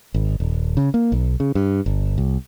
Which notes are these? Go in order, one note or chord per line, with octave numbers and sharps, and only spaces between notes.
G#1
D#1
C#3
A#3
B1
C#3
G2
G1
C2